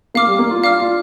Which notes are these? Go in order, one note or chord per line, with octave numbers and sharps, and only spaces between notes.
A#3 F5 D6 F6
G3
A#3
F4
D4 F5 D6 F6
F4